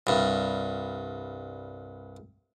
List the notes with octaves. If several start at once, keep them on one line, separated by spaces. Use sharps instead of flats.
C2 G2